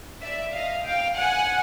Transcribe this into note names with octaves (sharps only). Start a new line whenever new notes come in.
D5 E5
D#5 F5
F5 G5
F#5 G#5